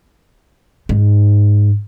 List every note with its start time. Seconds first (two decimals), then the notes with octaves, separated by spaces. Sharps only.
0.89 G#2